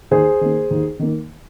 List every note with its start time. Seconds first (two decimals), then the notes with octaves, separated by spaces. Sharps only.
0.11 D#2 G#4 C5
0.41 D#3 A#3
0.71 D#2
0.99 D#3 A#3